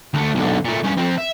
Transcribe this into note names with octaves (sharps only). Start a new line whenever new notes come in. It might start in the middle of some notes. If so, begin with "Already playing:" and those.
D2 A3
B1 D3
A#2 A3
G2 C#4
F2 C4
E5